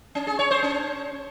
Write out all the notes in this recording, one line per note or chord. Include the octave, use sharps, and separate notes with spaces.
C#4
G#4
C#5
C5
C#4